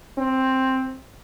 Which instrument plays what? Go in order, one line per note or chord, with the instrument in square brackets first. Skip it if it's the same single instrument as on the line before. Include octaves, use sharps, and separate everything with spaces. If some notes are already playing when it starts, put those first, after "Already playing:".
[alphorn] C4